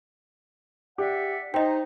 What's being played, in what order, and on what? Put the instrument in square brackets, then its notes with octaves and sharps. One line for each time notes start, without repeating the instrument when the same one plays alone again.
[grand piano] G4 [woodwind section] D5 E5 F#5
[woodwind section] D#4 [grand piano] C5 [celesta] D#5 G5